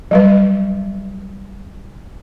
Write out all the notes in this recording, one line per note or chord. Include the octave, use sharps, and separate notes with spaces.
F#3 G3 B4